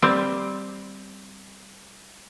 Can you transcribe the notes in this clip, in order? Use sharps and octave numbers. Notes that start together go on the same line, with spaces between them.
G3 C4